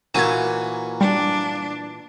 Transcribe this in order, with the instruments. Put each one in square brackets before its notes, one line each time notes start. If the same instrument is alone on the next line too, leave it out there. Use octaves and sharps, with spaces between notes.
[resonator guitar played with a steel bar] A#2 E3 [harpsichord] A#3 C#4 F#4 [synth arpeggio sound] G#6 D#7
[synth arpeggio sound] G3 [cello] D4